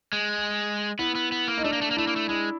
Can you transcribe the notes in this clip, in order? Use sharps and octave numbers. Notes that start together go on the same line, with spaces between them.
G#3
B3 E4
B3
B3
A#3
D#4
A3 D4
A#3
A3
A#3
A3 E4
A#3
A3
G#3 E4